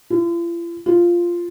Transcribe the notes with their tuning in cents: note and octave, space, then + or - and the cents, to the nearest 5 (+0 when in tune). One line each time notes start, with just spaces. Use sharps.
F4 -45
F4 -5